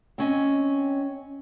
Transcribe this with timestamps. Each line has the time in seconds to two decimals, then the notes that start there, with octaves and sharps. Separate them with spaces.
0.18 C4 C#4 D#5